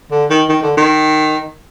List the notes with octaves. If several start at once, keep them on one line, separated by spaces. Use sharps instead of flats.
D3
D#3
D#3
D3
D#3